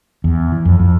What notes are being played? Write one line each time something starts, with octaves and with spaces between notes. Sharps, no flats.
E2
E3
F2
F2